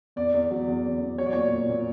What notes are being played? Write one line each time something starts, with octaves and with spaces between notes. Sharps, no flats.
E2 D5
E2
F#3
E2
E2
E2
F#3 C#5
D5
A#2 C#5
A#2
A#2